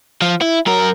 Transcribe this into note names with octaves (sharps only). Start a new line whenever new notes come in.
F3
E4
F#2 A#4